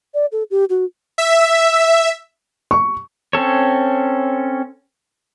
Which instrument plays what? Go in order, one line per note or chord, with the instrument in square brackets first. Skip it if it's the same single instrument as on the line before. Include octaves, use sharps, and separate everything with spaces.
[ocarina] D5
A4
G4
F#4
[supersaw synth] E5
[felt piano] C#6
[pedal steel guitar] C4 C#4 A4 C#5